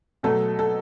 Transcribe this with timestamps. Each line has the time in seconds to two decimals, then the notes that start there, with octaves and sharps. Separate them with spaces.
0.23 B2 F#3 A3 A4
0.59 A4